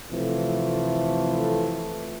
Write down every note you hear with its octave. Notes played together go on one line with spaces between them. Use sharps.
C3 E3 F3 A3